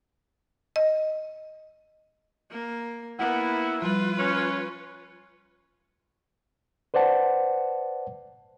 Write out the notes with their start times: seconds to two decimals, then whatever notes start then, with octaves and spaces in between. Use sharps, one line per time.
0.76 D#5
2.52 A#3
3.19 A#3 B3 E4 F#5
3.82 F3 G3 F4 B4
4.18 C#4
6.94 B4 C5 D5 F#5 A5